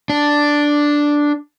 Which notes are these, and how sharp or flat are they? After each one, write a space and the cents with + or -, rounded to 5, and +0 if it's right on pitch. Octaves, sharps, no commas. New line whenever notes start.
D4 +0